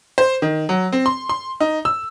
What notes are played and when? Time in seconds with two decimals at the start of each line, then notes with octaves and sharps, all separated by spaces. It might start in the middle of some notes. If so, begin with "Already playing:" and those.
0.18 C5
0.42 D#3
0.69 F#3
0.93 C4
1.06 C6
1.29 C6
1.60 D#4
1.85 E6